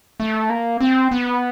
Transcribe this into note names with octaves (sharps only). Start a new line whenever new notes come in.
A3
A#3
C4
B3